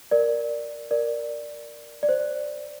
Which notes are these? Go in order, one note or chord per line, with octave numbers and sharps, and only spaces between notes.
A#4 D5
A#4 D5
D5
C5